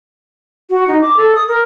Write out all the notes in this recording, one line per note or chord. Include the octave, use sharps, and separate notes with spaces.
F#4
D#4
D6
A4
D#6
A#4